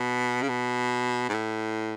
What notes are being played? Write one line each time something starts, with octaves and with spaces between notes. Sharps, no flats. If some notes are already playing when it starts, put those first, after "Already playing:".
Already playing: B2
C#3
B2
G#2
A2